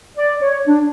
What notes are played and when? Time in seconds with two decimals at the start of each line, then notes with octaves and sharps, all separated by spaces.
0.17 D5
0.42 C#5
0.67 D4